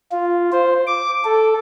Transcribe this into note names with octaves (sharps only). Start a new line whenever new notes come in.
F4
C5
D6
A4